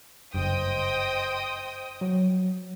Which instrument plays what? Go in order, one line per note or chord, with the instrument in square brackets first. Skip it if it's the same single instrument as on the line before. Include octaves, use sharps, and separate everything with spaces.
[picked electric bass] F#1 G2 [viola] C5 D#5 [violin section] G5 D#6
[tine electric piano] F#3